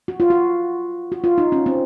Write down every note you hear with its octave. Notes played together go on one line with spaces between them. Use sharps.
F#4
F4
F#4
F#4
F4
D#4
C#4
C4